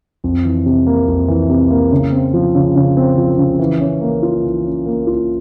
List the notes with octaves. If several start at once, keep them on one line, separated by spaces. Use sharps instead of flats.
F2
E3
C3
A#3
F2
E3
C3
A#3
C#3
C4
F3
C#3
C#3
C4
F3
C#3
E3
C#4
A#3
F4
E3
C#4
A#3
F4